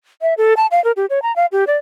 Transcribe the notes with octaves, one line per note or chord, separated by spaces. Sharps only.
E5
A4
A5
F5
A#4
G4
C#5
A#5
F5
G4
D5